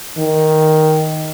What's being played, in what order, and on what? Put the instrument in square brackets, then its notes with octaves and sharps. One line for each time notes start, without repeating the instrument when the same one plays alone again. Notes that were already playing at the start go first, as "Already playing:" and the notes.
[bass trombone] D#3